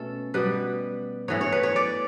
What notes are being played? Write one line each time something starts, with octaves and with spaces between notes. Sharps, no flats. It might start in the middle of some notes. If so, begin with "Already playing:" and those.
Already playing: B2 A3 C#4 A4
B2 G3 B3 B4
A2 E3 B3 C#5
C#5
B4
C#5
D5